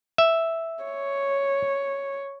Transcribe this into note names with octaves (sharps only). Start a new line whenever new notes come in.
E5
C#5